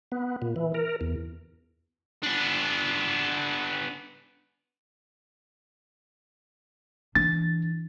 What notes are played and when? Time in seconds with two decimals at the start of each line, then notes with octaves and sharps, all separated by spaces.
0.12 B3
0.42 A#2
0.56 E3
0.74 A#4
1.01 E2
2.23 B3 D4
7.15 E3 D4 A6